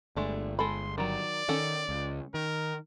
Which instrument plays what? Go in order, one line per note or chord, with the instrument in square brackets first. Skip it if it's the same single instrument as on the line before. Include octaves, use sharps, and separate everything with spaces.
[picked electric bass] G1 [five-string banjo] G#3 A3 D4
[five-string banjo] G#3 A4 B5 [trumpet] C6
[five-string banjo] D#3 F#3 [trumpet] D5
[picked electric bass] D#3 [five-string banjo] C#4 A4 F#5
[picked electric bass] C#2
[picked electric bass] D#3 [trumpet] A#4